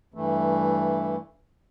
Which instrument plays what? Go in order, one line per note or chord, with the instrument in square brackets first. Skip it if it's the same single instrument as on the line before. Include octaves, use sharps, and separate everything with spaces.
[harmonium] G2 E3 A3